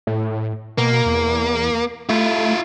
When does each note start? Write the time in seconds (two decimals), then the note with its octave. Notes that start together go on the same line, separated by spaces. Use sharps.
0.07 A2
0.78 B2 A#3
1.06 E2
2.09 A3 E4 F4